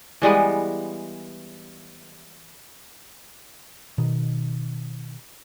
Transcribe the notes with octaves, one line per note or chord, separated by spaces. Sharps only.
E3 G3 G#3 B3
B2 D#3